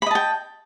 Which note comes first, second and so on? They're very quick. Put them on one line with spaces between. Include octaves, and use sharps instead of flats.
B5 D#5 A5 G5